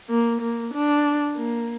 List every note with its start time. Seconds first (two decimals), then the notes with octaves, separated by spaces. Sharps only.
0.10 A#3
0.41 A#3
0.74 D4
1.37 A#3